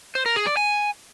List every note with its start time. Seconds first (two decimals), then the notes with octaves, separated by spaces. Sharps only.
0.15 C5
0.26 A#4
0.36 G#4
0.47 D5
0.57 G#5